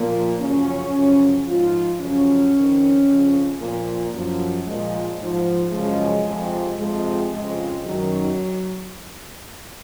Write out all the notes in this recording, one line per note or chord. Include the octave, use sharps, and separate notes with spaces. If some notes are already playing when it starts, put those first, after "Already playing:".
Already playing: A#2 F3 A#3
F#2 C#3 F3 C#4
F#2 C#3 F3
G#2 F3 F4
F#2 C#3 F3 C#4
F2 D#3
F2 C#3 F3
A#2 F3 A#3
F#2 F3
A#2 F3 G#3
G#2 F3
F#2 C#3 F3 G#3
F2 C3 F3
F2 C3 F3 G#3
F2 C#3 F3 G#3
F#2 D#3 F#3